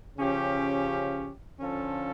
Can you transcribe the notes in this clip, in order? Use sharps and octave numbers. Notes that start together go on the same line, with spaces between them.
C#3 F3 C#4 G4
D3 F3 C#4 F4 A4